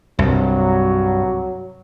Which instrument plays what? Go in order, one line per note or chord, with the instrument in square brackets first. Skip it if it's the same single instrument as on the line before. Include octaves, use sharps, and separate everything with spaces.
[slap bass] C2 [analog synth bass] G2 [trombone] F#3